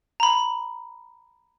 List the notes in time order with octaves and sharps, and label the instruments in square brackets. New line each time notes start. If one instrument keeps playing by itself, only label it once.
[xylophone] A#5 B5